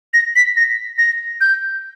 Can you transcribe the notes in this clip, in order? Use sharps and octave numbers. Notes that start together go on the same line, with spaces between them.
A#6
B6
A#6
A#6
G6